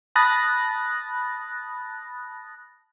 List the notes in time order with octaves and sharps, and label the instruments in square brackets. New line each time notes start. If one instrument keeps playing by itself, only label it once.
[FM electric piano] A5 B5 D#6 F#6 A6 A#6